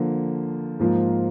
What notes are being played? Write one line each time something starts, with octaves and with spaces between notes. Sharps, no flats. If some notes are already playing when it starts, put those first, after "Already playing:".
Already playing: D3 F3 A#3
G#2 F3 A#3 F4